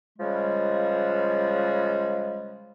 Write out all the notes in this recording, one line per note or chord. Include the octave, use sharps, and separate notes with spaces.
C#3 F3 G3 G#3